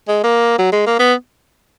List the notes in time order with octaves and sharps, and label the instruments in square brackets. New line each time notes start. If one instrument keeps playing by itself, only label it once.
[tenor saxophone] G#3
A#3
F#3
G#3
A#3
B3